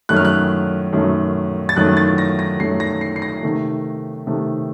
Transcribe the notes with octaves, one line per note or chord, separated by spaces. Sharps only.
F#2 D#3 A3 F#6
F6
F#6
F#2 D#3 A3
A6
F#2 D#3 A3 F#6
A6
A#6
A#6
F#2 D#3 A3 C7
A#6
C7
C7
A#6
C3 D#3 A3
C3 D#3 A3